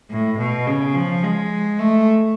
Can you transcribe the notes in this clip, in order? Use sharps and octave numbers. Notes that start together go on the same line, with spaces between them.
A2
B2
C#3
F3
G#3
A3